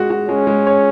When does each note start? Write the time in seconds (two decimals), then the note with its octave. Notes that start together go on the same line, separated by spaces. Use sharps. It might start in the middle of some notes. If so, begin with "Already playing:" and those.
Already playing: G#3 F#4
0.10 F#4
0.29 G#3 C#4
0.47 G#3
0.67 C#5